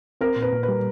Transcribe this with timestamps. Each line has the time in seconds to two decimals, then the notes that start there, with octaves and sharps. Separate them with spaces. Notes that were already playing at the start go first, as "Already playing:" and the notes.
0.21 C4 A#4
0.36 A#2
0.42 B4
0.52 A#2
0.63 B4
0.69 G3